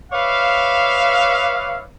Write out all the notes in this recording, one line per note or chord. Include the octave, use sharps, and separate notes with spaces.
B4 C#5 D5 E5 F5